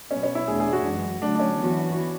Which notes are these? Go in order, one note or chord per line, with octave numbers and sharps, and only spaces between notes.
B2 F#3 B3 C#4
C#4
E4
E2 B2 A3 D4 G#4
G#4
F#4
F#2 E3 G#3
D3 F#3 A3 D4
D4
C#4
E3 B3 F#4